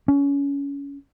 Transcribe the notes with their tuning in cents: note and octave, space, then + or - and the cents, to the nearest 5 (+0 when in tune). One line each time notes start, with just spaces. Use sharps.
C#4 +25